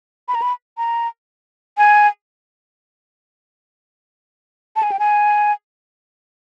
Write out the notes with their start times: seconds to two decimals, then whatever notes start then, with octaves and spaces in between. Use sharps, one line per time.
0.28 B5
0.35 A#5
0.42 B5
0.78 A#5
1.78 G#5
4.76 A5
4.83 G#5
4.92 G5
4.99 G#5